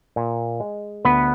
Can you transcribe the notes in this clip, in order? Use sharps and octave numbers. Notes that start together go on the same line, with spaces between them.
A#2
G#3
D2 B3 B4